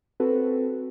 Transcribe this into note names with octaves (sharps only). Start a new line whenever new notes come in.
C4 F#4 A4 B4